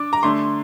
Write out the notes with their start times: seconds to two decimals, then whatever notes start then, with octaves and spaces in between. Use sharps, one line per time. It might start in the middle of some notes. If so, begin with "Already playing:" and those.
Already playing: D4 D6
0.13 A#5
0.23 D3 A3 D4 C6